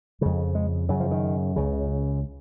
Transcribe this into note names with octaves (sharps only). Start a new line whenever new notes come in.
F2 C#3 G#3
G#3
F#2 C#3 F#3
F3
D#3
C#2 C#3